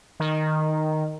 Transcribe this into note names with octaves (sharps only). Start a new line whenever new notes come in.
D#3